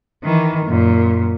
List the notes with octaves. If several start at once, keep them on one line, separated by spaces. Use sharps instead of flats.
D#3 E3
F#2 A#2